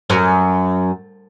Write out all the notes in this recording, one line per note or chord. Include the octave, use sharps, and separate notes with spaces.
F#2